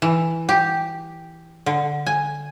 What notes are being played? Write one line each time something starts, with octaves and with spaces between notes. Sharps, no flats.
E3
G4
D3
G#5